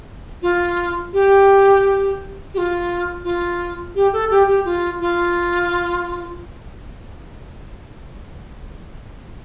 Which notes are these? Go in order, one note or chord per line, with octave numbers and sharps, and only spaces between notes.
F4
G4
G4
F4
F4
G4
A4
G4
G4
F4
F4